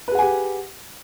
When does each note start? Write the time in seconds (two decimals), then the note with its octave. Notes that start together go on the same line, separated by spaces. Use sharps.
0.08 B4
0.11 G#4
0.15 F#5
0.19 G#5
0.22 G4